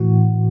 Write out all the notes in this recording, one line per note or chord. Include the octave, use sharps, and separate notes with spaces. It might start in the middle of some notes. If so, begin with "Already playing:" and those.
Already playing: A2 E3 F#4